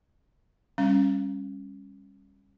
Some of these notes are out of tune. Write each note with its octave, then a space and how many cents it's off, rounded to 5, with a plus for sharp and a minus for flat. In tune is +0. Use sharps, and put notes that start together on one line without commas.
G3 +25 C#4 -20 F5 -25